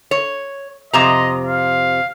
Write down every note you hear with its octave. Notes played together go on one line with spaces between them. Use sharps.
C#5
F2 C3 D#5 A#5
F5